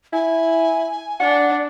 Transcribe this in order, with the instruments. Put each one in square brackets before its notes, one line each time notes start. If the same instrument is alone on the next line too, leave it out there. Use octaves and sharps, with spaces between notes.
[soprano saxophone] E4 [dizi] G#5
[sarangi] D4 [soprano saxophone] F#5